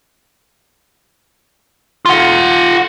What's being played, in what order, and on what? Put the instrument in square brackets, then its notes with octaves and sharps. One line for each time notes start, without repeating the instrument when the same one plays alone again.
[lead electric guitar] F4 F#5